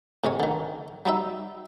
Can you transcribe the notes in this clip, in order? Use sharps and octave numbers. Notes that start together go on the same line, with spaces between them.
A2 C3 G#3 C#5
D3 D#3
F#3 G3 D#4 E5